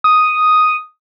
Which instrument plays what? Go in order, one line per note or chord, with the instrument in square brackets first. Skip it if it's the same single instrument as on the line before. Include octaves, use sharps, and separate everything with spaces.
[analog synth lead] D#6